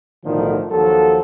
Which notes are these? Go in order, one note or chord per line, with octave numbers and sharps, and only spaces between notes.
B1 A2 D3 D#3 F3
D#2 F3 F#3 A4